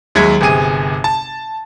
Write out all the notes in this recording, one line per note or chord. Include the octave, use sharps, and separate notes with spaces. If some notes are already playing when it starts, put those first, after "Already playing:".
D#2 F#3 G#3 E5 G#6
G1 C3 G#4 D#7
A5